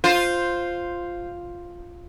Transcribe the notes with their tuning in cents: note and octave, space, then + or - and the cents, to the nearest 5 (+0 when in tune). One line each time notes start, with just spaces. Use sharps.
F4 +0 C5 +0